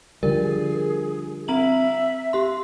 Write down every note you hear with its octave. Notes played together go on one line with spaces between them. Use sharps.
D3 F3 G3 A#4
G#4
C4 E5 A#5 F#7
G4 C6